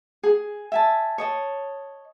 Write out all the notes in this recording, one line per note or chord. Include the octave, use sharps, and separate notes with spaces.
G#4
E5 G#5 A5
C#5 D#5 A5